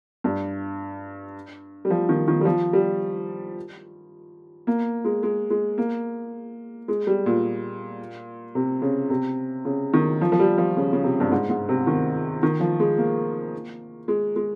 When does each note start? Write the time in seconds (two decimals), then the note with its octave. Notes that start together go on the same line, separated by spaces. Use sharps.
0.24 G2
1.85 G3
1.90 F3
2.09 D#3
2.28 D#3
2.41 G3
2.45 F3
2.73 G3
4.67 A#3
5.05 G#3
5.23 G#3
5.50 G#3
5.78 A#3
6.88 G#3
7.07 G3
7.26 A#2
8.55 C3
8.82 C#3
9.10 C3
9.65 C#3
9.93 D#3
10.21 F3
10.32 F3
10.39 G3
10.58 F3
10.77 C#3
10.93 C#3
11.04 C3
11.20 G2
11.31 G#2
11.50 G#2
11.69 C3
11.87 D#3
12.43 D#3
12.60 F3
12.80 G#3
12.98 A#3
14.08 G#3
14.36 G#3